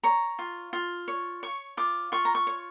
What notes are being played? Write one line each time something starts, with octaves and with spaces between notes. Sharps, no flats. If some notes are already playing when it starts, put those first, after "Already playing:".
C#5 A#5
F4
F4
C#5
C#5 C#6
F4 D6
F4 C#6
A#5
C#6
C#5